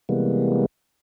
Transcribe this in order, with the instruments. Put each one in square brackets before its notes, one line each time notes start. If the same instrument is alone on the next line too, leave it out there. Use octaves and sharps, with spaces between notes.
[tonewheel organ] C3 E3 G3 G#3 A#3 B3